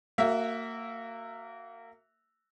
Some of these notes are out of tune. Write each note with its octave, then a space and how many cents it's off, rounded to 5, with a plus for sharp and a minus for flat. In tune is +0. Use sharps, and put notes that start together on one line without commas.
A#3 -25 F#4 +0 E5 +0